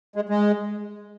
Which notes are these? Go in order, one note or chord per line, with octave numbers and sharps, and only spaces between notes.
G#3
G#3